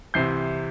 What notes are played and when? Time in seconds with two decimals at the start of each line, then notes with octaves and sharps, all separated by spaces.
0.14 C2 C3 E3 G6 C7